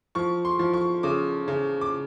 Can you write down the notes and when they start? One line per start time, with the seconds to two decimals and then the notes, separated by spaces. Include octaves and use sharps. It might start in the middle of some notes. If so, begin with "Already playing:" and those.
0.15 F3 C#6
0.45 C6
0.59 F3
0.74 C#6
1.03 C#3 D6
1.48 C#3
1.81 D6